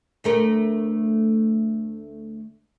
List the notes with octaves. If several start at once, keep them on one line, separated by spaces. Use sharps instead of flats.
D2 A3 A#4